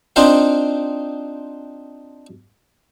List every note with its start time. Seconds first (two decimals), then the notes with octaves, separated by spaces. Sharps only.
0.16 C4 D4 D#4 F4 C5 F5